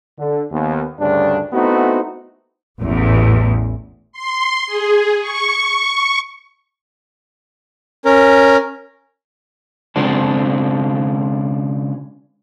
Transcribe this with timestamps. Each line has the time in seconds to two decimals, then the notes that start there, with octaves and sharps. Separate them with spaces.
0.19 D3
0.52 D#2 B3
1.00 D2 G2 C#3 D4
1.53 A3 B3 C4 D#4 E4 F#4
2.81 A1 E2
4.12 C6
4.67 G#4
5.20 C#6
8.05 C#4 A#4
9.96 C#3 G#3 C4 D4 A4